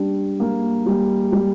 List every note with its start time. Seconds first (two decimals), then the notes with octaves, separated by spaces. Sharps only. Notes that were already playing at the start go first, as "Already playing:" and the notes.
Already playing: G3 D4
0.40 A#3
0.86 G3
1.32 G3